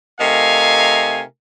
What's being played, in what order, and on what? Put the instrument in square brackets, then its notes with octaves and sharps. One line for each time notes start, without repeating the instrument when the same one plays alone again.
[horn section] C3 A3 D#4 A#4 F5 G#5